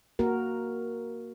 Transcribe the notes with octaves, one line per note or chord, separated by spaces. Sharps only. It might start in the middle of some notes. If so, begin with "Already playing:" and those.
A#3 F#4 A#4